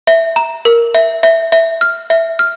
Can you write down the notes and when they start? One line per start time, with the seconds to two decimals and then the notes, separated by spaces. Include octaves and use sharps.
0.07 E5
0.36 A#5
0.65 A#4
0.95 E5
1.23 E5
1.52 E5
1.81 F6
2.10 E5
2.39 F6